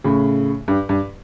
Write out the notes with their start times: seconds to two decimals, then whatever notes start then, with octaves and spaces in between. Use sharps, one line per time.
0.04 A2 C#3
0.68 G2
0.89 G2